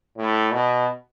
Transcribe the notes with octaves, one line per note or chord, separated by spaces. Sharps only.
A2
B2